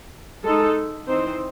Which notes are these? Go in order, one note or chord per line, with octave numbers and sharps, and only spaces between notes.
G#3 D#4 A4
E3 C4 D#4 C5